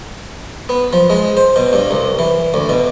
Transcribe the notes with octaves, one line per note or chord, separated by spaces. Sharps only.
B3
F3
G#3
C5
B2
G2
C2
E3
D2
B2